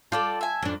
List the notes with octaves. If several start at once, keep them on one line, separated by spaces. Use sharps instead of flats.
F4 A4 D5 G5 A5
E5 G#5
F2 D4